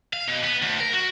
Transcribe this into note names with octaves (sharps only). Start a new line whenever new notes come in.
F5
B2
B3
D2
A#4
F#4